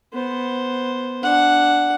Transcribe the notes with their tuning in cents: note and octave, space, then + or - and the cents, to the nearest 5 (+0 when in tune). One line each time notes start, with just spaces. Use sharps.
B3 +0 C5 +0
D4 +0 F#5 +0